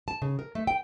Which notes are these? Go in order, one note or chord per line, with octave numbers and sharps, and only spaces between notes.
A5
C#3
A#4
A3
G5